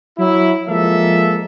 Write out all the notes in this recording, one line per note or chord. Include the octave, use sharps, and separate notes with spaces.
F#3 E4
F3 G#3 A#3 A4 E5